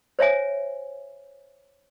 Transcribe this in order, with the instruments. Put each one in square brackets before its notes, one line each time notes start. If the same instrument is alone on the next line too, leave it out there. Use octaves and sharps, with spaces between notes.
[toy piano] C5 C#5 E5 G#5